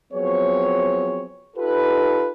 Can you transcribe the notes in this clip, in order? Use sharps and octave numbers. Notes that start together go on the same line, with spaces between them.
F3 F#3 B3 C4 G#4 C#5
D#4 F4 G4 A4 B4